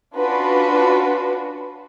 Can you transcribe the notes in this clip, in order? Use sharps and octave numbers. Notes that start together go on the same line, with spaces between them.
C#4 D4 F4 F#4 B4